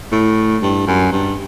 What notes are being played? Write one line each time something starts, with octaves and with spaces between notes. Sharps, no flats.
A2
G2
F#2
G2